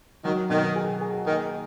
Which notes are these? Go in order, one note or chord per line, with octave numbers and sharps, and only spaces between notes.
D#3 F#3
B2 D#3
G#4
G#4
D#3 A#3